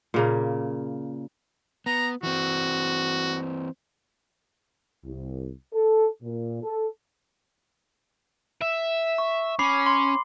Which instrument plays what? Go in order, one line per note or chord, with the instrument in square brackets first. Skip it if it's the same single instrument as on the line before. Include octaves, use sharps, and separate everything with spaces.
[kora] A#2 C#3 A#3
[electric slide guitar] B3 [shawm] A#5
[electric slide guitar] E3 C4 [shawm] F#4
[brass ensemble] C2
A4
A#2
A4
[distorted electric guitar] E5
[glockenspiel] C#6
[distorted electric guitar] C#4 [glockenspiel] B5 D6 C7
[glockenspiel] C6